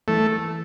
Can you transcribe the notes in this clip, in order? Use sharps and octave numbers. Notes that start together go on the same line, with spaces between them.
E3 A3